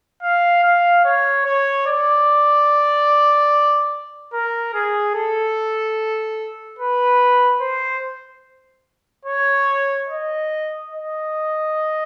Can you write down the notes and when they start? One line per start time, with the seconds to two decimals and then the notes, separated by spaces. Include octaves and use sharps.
0.22 F5
0.64 F5
1.05 C#5
1.45 C#5
1.87 D5
4.33 A#4
4.74 G#4
5.15 A4
6.79 B4
7.61 C5
9.25 C#5
10.07 D#5
10.90 D#5